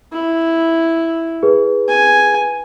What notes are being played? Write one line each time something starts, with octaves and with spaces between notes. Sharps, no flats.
E4
G#4 B4
G#5